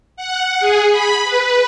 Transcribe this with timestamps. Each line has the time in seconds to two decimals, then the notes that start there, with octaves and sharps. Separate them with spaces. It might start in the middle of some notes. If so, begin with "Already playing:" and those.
0.16 F#5
0.60 G#4
0.90 B5
1.24 B4